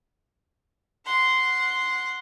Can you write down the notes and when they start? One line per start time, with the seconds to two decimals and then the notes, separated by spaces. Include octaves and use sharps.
1.06 F#5 C6